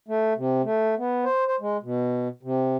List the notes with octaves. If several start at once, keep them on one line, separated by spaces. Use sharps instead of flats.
A3
C3
A3
B3
C5
C5
G#3
B2
C3